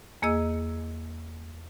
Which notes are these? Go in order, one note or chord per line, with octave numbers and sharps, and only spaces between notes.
E2 A#3 G#4 D#5 E6